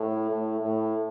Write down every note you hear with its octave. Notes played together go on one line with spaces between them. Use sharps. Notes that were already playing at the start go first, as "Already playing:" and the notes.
Already playing: A2
A2
A2